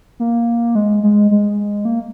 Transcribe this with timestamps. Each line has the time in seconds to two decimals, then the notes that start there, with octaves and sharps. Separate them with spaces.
0.20 A#3
0.75 G#3
1.03 G#3
1.31 G#3
1.85 A#3